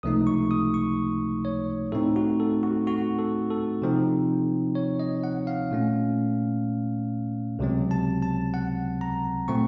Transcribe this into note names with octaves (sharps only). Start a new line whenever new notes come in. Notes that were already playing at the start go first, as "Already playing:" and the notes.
C#2 C3 F3 A3 D#4 D#6
C#6
D#6
C#6
C#5
A2 A3 C4 D#4 A4
F#4
A4
F#4
F#4
A4
A4
C3 F3 C4 D#4
C#5
D#5
F#5
F5
A#2 A3 C#4
C#2 C3 F#3 C4
A5
A5
F#5
A#5
A#2 A3 C4 C#6